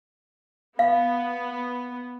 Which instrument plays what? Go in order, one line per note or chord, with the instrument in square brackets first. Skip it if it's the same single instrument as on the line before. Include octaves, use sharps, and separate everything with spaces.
[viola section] B3 [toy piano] F5